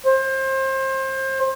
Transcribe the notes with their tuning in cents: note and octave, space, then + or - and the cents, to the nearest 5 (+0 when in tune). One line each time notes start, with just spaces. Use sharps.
C5 +30